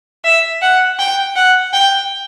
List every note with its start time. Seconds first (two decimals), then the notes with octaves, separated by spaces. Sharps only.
0.24 E5
0.62 F#5
0.99 G5
1.36 F#5
1.73 G5